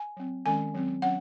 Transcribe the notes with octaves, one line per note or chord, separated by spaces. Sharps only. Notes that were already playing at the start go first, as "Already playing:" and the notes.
Already playing: G#5
F#3 C4
D#3 G#3 C#4 G#5
F#3 C4
F#3 C#4 F#5